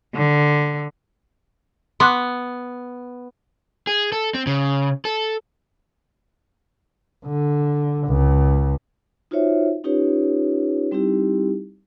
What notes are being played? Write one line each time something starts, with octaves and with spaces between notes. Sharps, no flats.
D3
B3 C6 D6 F#6
G#4
A4
C4
C#3
A4
D3
C#2
D#4 F4 F#4 C5 C#5 E5
C#4 D#4 F4 G4 B4 C#5
G3 C4 D#4 E4 G4